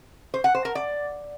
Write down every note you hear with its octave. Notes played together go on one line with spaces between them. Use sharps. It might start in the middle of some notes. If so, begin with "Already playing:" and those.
C5
F#5
C5
A#4
D5